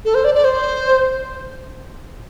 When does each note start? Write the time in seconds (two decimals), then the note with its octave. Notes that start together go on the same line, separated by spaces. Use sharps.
0.05 A4
0.15 C5
0.24 D5
0.35 D5
0.44 C5